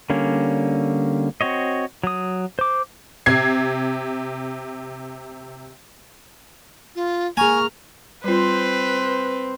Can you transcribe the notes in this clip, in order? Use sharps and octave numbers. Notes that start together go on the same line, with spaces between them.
D3 G3 A#3 C#4
C4 F#4 C#5 D#5
F#3 D#6
C5 D6
C3 G#6 C7
F4
A#3 G#4 G#5 A#5 C#6 F6
G3 C4 F4 B4 C5